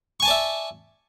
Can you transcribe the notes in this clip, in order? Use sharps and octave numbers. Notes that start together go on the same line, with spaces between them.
D5 E5 G#5 A5 C#6